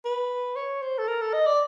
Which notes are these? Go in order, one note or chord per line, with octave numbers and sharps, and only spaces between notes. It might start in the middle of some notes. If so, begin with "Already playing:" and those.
B4
C#5
C5
A4
A#4
A4
D#5
D5